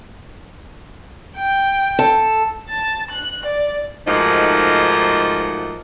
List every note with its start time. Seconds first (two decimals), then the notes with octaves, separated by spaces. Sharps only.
1.37 G5
1.99 A4
2.68 A5
3.11 F#6
3.45 D5
4.07 G#2 F3 A3 A#3 D#4 F#4